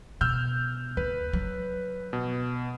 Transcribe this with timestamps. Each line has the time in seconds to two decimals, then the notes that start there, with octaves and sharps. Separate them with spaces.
0.21 B2 E6 F6 G6
0.97 D#2 B4
1.33 F#3
2.13 B2